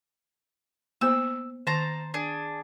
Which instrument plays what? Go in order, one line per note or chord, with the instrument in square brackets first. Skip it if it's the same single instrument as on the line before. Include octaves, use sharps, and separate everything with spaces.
[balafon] A#3 B3 C5 [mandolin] E6
[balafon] D#3 [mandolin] C5 A5 A#5
[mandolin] D4 G#4